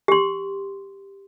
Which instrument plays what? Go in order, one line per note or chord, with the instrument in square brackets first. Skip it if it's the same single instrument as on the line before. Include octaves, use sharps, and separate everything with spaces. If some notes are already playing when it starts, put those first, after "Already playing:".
[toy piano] G4 C6